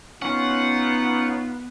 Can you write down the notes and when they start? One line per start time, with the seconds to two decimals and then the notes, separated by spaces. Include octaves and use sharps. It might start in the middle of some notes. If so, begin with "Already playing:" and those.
0.22 B3 C#4 D#4 F4 F#5